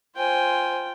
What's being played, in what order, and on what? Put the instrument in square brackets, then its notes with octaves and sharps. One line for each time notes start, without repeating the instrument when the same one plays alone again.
[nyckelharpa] F4 G5 [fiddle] C5 G#5